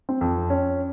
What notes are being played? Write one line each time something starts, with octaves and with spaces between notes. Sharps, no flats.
C4
F2
C#4